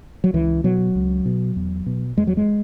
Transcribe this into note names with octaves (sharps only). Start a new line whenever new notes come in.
F#3
C#2 E3
B2 F#3
C#2
B2
E2
B2
E2 G#3
F#3
G#3